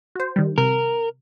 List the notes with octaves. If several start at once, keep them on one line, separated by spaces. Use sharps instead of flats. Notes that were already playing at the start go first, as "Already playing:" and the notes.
F#4 C5
D#3 G3
C3 A#4